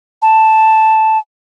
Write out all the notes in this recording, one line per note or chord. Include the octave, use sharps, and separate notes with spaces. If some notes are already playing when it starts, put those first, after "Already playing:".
A5